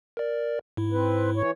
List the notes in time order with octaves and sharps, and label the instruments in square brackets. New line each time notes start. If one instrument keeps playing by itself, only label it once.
[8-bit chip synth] A#4 D5
G#2 E4
[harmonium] C4 B4
E3 C#5